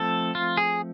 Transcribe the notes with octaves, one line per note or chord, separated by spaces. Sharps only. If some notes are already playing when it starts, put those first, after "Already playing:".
Already playing: F3 A3 C4 A4
F4
G#4